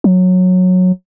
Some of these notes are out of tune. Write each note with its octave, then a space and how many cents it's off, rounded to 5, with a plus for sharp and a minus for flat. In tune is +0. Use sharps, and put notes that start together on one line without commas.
F#3 -15